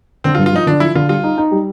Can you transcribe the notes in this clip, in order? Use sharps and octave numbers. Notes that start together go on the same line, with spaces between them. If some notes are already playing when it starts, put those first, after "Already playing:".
D3 C4
F4
G2
F4
F3 D#4
D3 D4
F3 E4
D3 F4
G3 F4
D#4
D#4
G3